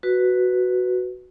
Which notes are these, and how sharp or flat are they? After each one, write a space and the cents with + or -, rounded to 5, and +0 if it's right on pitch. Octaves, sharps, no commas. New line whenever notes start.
F#4 +0 B4 +0